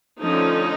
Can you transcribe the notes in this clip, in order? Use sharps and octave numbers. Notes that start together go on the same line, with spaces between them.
D3 F3 A3 C#4 D#4